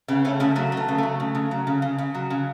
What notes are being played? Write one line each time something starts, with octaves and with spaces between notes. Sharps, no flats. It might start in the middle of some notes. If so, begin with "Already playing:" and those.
C#3 B3
A3 C#4
C#3 A3
F#3 A3
A3 B3
C#3
F#3 A3
C#3
C#3
F#3
C#3
C#3
C#3
F#3
C#3